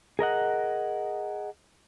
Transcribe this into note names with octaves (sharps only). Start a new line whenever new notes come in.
G#4 A#4 D#5 F#5